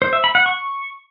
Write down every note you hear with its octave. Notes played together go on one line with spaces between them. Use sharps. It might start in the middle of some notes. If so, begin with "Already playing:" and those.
C5
E5
B5
F#5
C#6